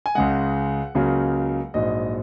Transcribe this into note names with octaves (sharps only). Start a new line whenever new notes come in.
G#5
C#2 C#3 G#3 F#5
C#2 C#3 F#3 A#3
A#1 G#2 F#3 D#5